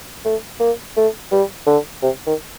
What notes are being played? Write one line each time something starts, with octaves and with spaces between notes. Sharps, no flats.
A3
A#3
A3
G3
D3
C3
D#3